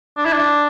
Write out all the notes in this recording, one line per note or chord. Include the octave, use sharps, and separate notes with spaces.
D4
E4
D4